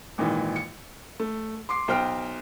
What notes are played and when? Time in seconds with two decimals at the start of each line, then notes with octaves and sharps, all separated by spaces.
0.18 G#1 A#2 D#3 E3
0.56 C#7
1.20 A3
1.69 C6 D6 C7
1.88 B1 C5 G5 F6 D7